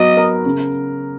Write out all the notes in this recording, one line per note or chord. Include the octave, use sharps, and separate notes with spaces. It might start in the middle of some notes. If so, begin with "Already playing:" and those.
Already playing: F#3 B3 F#4 D#5
A#4
C#3